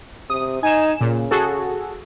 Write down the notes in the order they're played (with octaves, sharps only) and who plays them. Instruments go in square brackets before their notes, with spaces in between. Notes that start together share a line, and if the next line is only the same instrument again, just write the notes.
[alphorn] C3 [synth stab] D#6
[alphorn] D#4 [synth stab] G#5 E7
[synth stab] A#2 [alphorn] C#3
[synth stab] F#4 G#4 A4